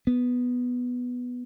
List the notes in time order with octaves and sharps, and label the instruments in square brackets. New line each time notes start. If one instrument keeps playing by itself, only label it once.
[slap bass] B3